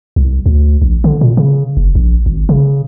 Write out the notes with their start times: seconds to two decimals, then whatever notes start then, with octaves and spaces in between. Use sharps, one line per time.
0.16 C2
0.46 D2
0.82 A#1
1.04 D3
1.21 A#2
1.37 C#3
1.77 F#1
1.95 A#1
2.26 G#1
2.49 C#3